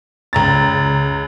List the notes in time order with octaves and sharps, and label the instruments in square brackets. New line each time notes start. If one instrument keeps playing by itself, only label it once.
[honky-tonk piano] C#2 A#5 A6